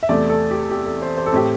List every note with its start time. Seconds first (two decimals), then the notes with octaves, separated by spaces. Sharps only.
0.03 E5
0.09 E2 C3 A3 C4 D5
0.29 A4
0.51 G4
0.71 G4
0.86 A4
1.02 C5
1.18 C5
1.26 A4
1.32 A2 A3 C4 G4